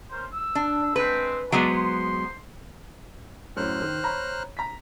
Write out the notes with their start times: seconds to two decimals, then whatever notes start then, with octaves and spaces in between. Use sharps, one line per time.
0.11 C#4 A#4 C5
0.33 E6
0.55 D4
0.96 G#3 C4 B4
1.52 F#3 G#3 B3 D4
1.70 C5 C6
3.57 F#2 A2 C5 F6 F#6
3.82 D#3
4.03 C#5 A#5 B5
4.57 A#5 B6